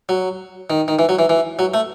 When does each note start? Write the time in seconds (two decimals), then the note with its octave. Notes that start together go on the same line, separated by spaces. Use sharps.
0.09 F#3
0.70 D#3
0.88 D#3
0.99 E3
1.09 F#3
1.19 E3
1.29 E3
1.59 F#3
1.74 A3